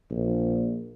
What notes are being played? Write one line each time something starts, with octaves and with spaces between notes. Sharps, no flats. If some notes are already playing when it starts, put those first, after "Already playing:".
A#1